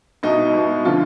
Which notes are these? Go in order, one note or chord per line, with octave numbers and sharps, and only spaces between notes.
C2 B2 D#4
C2 B2
D3 F3 F4